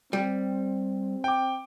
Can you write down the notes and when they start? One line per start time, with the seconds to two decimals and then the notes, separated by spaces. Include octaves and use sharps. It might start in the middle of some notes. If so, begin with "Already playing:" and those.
0.13 G3 C4
1.24 G5 D6